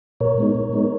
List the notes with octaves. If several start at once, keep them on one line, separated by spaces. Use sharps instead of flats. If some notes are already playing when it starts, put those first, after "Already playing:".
A#2 A#4 C#5
G#3 B3 D#4
A#2
G#3 B3 D#4